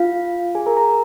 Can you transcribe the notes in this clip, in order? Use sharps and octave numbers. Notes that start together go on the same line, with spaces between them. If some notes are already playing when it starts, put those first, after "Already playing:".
Already playing: F4 F5
G#4 G#5
A#4 A#5
A#4 A#5